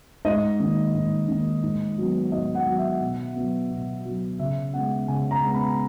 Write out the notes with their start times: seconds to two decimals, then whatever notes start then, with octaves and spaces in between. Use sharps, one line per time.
0.25 G#2 D#5
0.60 D#3 A#3
0.94 G#2
1.28 D#3 A#3
1.63 G#2
1.98 F#3 B3
2.32 G#2 D#5
2.55 F#5
2.66 F#3 B3
2.78 E5
3.01 B2
3.36 F#3 B3
3.70 B2
4.05 F#3 B3
4.39 C#3 E5
4.74 G#3 B3 F#5
5.08 C#3 G#5
5.31 A#5
5.43 G#3 B3
5.54 B5